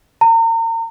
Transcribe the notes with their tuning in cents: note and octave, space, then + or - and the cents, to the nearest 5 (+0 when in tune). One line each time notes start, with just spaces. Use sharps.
A#5 -35